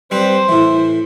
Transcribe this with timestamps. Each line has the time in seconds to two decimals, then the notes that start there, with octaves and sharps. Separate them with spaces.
0.11 G3 C4 B4 C5
0.49 A2 E3